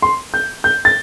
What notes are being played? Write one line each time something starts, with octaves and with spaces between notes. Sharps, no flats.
C6
G6
G6
A6